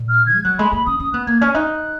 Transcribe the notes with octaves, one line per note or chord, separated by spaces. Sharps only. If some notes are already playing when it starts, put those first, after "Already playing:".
Already playing: A#2
F6
G#6
G#3
F#3 F#6
G#3 B5
A#3 B5
C#4 D#6
C#4 D#6
B3 F#6
A#3 G#6
C#4 F6
D#4 F#6